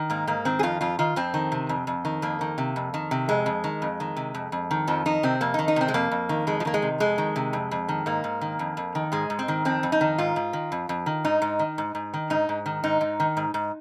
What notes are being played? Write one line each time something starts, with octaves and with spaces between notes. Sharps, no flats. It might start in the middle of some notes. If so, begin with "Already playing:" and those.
Already playing: D#3
G#2 A#3
G#2 A#3
D#3 C4
G#4
F2 F4
F2 F4
D#3 F4
F2 C4
D#3
C3
F2
F2
D#3
F2 A#3
D#3
C3
F2
D#3
C3
F2 G#3
F2
D#3
F2
D#3
C3
F2
F2
D#3
F2 F3
D#3 D#4
C3 C4
F2 A#3
D#3 D#4
D#4
C3 C4
G#3
F2 A#3
F2
D#3
F2 G#3
F3
D#3 A#3
G#3
C3
F2 G#3
D#3
C3
F2
F2
D#3
G#2 A#3
G#2
D#3
F2
F2
D#3
G#2 G#3
G#2
C4
D#3
F2 C4
F2
D#4
D#3
G#2 F4
G#2
D#3
F2
F2
D#3
G#2 D#4
G#2
D#3
G#2
G#2
D#3
G#2 D#4
G#2
D#3
G#2 D#4
G#2
D#3
G#2
G#2